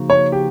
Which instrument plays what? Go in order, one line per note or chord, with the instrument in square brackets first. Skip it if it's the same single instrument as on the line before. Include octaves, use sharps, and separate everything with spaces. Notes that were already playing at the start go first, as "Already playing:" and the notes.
Already playing: [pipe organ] C#3 F3 A#3 D#4 F#4
[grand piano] C#5
G4